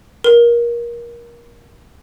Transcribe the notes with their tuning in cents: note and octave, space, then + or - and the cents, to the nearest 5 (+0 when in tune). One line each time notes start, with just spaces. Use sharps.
A#4 +25